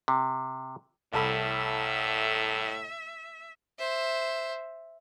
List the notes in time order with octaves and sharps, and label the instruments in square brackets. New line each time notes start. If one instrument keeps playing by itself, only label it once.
[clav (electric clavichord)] C3
[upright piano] C2 A4 B5 [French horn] A2 [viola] E5
[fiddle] C5 E5